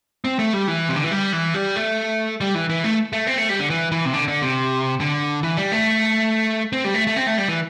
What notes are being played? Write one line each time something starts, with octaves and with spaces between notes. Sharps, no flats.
C4
A3
G3
E3
C3
D3
E3
G3
E3
G3
A3
G3
E3
E3
A3
A3
C4
A3
G3
D3
E3
E3
C3
D3
D3
C3
D3
E3
G3
A3
C4
G3
A3
A3
C4
A3
G3
E3